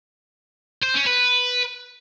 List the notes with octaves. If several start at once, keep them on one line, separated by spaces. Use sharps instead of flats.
C5
C#4
B4